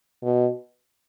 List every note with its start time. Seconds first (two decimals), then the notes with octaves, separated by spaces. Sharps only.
0.23 B2